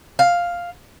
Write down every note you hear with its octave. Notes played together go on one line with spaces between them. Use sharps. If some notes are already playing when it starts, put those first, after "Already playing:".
F5